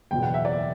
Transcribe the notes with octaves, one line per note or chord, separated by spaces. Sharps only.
F#1 E2 B2 G5
F#5
E5
D5